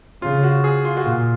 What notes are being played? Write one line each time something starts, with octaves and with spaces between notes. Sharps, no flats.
C#3 F4
F#4
G#4
F4
F#4
A#2 F4